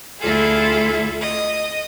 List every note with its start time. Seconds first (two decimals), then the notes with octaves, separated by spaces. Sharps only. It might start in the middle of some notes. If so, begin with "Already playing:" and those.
0.20 D2 E4 F4 G#4 A4
1.20 D#5